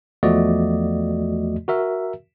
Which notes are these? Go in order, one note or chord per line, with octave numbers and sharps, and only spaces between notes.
E2 F3 A3 F#4 D5 D#5
F#4 A#4 E5